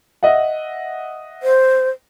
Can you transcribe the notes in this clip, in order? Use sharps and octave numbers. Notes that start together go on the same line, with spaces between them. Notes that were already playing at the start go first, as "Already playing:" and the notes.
D#5 E5 F#5
C5